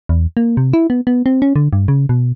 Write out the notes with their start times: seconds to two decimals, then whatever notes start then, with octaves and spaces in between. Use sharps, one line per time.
0.09 E2
0.37 A#3
0.57 C3
0.73 E4
0.90 B3
1.07 B3
1.26 C4
1.42 C#4
1.56 D3
1.73 G2
1.88 C#3
2.09 B2